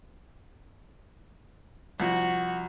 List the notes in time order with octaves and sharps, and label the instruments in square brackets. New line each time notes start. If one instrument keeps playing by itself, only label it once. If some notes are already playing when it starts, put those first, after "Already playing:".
[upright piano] C2 F3 [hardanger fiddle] F#4